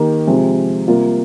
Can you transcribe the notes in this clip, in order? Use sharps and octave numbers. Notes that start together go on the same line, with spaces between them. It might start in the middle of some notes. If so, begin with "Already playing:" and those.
Already playing: D#3 A#3 D#4 G4
C3 F3 G#3 C4
C3 G3 A#3 F4